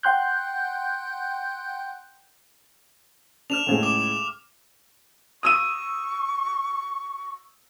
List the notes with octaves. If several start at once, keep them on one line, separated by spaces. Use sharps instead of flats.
F#5 G5 C6 F#6 G6
D4 F6 E7 F7
C#2 A2 G#3
D6 E7
C#6 D#6 E6 D#7